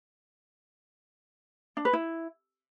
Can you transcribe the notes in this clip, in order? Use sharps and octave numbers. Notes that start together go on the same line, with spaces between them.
D4
B4
E4